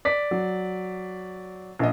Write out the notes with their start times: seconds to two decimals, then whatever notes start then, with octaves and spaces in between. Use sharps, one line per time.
0.05 D5 B6
0.31 F#3
1.79 A#1 D#5